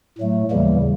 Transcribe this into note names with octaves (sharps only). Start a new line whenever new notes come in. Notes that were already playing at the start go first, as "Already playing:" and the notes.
A2 F#3 A3
D#2 C#3 E3 G3 A#3